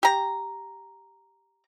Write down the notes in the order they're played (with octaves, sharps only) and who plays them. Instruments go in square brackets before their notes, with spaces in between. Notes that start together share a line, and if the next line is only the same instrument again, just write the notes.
[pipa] G4 A#5